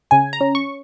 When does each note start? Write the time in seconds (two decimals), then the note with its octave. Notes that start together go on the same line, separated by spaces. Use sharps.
0.11 C#3 G#5
0.33 A#5
0.41 C#4
0.55 C#6